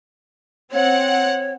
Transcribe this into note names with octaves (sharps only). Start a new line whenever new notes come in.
C4 C#5 F#5